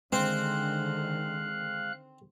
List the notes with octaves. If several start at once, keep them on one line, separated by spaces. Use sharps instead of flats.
D3 D#3 G#3 C4 F5 F#6